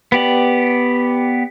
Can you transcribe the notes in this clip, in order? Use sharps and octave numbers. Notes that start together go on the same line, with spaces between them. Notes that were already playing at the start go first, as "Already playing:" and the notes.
B3 G4 D5